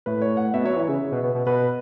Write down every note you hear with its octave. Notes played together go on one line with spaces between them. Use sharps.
A2 B4
C#5
F#5
B2 E5
F#3 C#5
E3 E5
C#3
B2
B2
B2
B2 B4